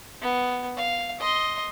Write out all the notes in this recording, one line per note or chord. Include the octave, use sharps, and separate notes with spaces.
B3
F5
D#5 C6